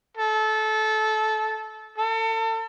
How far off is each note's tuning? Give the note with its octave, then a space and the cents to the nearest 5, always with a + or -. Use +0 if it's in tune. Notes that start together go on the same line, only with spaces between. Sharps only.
A4 -20
A4 +35